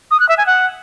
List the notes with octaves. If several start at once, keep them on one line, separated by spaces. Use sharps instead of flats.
D#6
F#6
E5
G#5
F#5